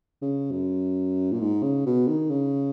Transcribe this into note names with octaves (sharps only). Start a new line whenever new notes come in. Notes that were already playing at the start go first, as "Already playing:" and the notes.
C#3
F#2
A#2
G#2
C#3
B2
D#3
C#3